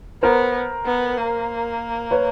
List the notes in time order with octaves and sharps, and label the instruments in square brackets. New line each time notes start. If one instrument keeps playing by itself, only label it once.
[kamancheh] B3 [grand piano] A#4 C5
[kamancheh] B3
A#3
[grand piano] B4 C#5